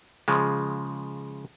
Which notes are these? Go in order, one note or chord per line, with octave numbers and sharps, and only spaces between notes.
C#3 F3 G#3